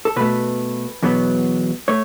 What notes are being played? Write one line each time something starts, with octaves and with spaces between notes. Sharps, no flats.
A4
B2 A3 B4
E2 B2 F#3 B3
A3 C#5